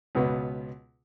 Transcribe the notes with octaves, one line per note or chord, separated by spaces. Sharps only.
C#2 B2 B3